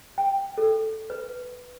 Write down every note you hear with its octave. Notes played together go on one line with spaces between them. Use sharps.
G5
A4
B4